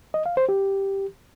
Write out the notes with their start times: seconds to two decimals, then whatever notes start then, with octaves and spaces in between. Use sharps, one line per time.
0.14 D#5
0.26 F5
0.37 C5
0.49 G4